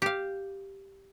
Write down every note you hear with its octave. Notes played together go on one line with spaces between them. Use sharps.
G4 F5